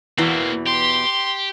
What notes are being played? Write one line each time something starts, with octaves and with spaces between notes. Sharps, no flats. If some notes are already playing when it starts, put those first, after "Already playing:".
E2 B2 E3 A#3 C4
G4 C6